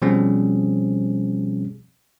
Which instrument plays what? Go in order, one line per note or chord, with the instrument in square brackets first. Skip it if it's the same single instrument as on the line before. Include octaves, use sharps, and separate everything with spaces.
[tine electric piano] B2 F3 G3 C4 C#4 G#4